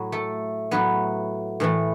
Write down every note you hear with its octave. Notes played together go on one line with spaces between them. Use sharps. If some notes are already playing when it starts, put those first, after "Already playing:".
Already playing: A2 F#3
A3 A4
A2 F#3 A3 B3 B4
A2 E3 A3